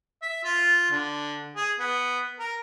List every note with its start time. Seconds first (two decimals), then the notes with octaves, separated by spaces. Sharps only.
0.22 E5
0.44 F4
0.91 D3
1.56 G#4
1.80 B3
2.39 A#4